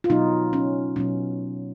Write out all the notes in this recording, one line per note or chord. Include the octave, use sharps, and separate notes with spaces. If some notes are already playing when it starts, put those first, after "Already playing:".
F4
B2 F#3 B3 D#4
C#4
B2 F#3 B3 C#4